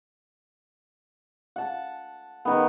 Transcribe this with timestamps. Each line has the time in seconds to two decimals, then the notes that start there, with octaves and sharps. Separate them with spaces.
1.56 F#5 A5
2.45 D#3 B3